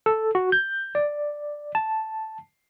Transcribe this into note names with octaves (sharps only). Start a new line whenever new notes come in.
A4
F#4
G6
D5
A5